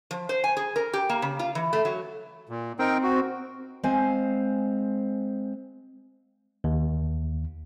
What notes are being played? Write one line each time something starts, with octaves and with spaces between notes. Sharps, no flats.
F3
C5
G#5
G#4
A#4
G4
A#3
C#3
F4
E3
A3
F#3
A#2
C4 D#4 A#4 G5
F#4
G#3 C4 C5 F5 G#5
D#2